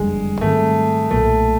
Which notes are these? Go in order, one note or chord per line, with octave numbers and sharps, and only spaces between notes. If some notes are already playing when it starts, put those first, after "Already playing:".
Already playing: F#1 F2 D3 G3 G#3
G#2 D#3 G3 A3 C4
B1 A#2 F#3 A3